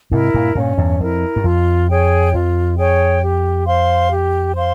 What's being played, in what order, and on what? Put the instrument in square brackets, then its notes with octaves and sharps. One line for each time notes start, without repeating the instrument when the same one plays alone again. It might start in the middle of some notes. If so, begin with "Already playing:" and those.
[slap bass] G#2 C3 [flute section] E4 A#4
[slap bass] G2 A#2
[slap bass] G2 A#2 [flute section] C#4
[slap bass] E2 G2
[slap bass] F2 [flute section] E4 A#4
[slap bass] G2
[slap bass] F2 [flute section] F4
[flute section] G#4 C#5 G5
[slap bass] F2 [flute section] F4
[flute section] G#4 C#5 G5
G4
C5 F5 C6
G4
C5 F5 C6